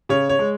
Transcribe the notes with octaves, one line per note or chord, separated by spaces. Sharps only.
C#3 C#5
C#5
G#3